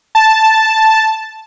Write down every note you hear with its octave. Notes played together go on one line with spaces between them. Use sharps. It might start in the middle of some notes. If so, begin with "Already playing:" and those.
A5